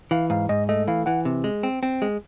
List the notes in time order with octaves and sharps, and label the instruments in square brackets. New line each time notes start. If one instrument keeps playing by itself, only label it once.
[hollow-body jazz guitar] E3 [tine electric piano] F5
[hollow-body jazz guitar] G#2 [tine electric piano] F5
[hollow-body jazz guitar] G#2 [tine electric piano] D#5
[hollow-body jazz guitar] A3 [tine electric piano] D#5
[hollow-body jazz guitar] E3 [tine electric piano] F5
[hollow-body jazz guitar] E3 [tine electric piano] F#5
[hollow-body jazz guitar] C3
G#3
C4
C4
G#3